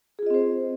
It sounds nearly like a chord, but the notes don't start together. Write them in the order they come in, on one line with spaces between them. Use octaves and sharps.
G#4 F4 D#5 C4 C5